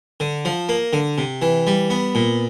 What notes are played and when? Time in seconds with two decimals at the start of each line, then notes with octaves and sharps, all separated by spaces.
0.20 D3
0.45 F3
0.69 A#3
0.93 D3
1.18 C3
1.42 E3
1.67 G3
1.90 B3
2.15 A#2